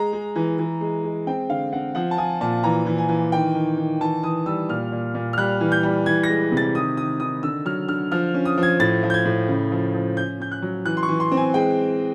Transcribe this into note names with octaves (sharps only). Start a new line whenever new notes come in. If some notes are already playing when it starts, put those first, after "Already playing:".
Already playing: G#3 A#5
G#3
E3
E3
G#3
G#3
C4 G5
D3 F5
C4 F#5
F3 F#5
A5
F3 G#5
A#2 A5
E3 A#5
E3
G#5
E3
D#3 G5
D#3
D#3
E3 A5
E3 D#6
G3 E6
A#2 F6
A#2
A#2
F6
G3 F#6
E3
G6
G3
E3 G#6
A#6
G#3
C3
A6
D#3 D#6
D#3 D#6
D#3 D#6
D3 E6
F#3 F6
D3 F6
F3 F6
C#4
D#6
F3
G#6
A2 A6
F3
G6
G#6
A2
C#3
F3
F3
C#4 G6
C#4 G6
F#6
F#3
E3 F#6
C6
C#6
E3
C6
C4
G#5
G#3 G5